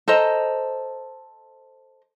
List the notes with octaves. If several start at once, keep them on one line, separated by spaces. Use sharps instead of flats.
A4 C5 D#5 A#5